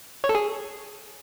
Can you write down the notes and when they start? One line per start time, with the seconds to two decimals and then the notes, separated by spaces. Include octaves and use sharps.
0.24 C#5
0.29 A4
0.35 G#4